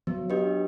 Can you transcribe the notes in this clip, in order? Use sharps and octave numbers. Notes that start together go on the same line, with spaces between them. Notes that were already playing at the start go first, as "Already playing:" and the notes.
F#3 B3
D4 G4 B4 D#5